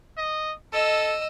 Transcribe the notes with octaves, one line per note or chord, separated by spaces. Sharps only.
D#5
A4 D#5 E6